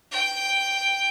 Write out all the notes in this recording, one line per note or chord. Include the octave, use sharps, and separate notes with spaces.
G5